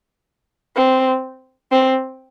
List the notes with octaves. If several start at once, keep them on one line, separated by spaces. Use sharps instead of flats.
C4
C4